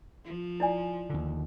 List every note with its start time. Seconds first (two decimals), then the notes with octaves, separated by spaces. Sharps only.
0.24 F3
0.60 E4 D5 G#5
1.10 D#2 D3